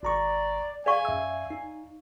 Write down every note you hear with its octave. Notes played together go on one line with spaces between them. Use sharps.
G#1 D5 A#5 C#6
G#4 D5 F5 G#5 C#6
F#2 E5 E6
D#4